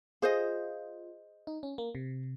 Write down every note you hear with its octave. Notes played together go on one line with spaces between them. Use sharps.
F4 G#4 C5 D#5
D#4
C#4
A#3
C3